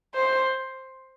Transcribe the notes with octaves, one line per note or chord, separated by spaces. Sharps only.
C5